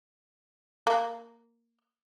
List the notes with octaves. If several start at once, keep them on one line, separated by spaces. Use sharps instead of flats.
A#3